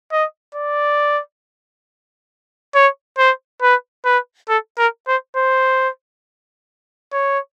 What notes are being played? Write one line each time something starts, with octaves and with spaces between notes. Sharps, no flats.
D#5
D5
C#5
C5
B4
B4
A4
A#4
C5
C5
C#5